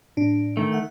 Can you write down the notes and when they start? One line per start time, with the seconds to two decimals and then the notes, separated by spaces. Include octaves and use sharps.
0.17 A2 D4
0.57 D#3 A3
0.72 E5 F#5